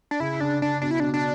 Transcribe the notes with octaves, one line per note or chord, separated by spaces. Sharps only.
D4
C#3 E4
C#3 D4
C#3 D4
B2 D4
E4
B2 D4
D4